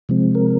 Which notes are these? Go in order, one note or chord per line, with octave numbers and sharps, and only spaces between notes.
C3 F3 G#3 C4
A#4